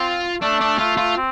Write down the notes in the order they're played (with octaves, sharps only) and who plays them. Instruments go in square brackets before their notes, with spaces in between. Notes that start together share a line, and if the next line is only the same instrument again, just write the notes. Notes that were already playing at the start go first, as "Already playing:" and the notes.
Already playing: [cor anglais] C4 [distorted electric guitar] F4
[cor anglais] A3 [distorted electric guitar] D4
[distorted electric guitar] D4
[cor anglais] A3 [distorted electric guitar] F4
[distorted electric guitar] F4
[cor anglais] C4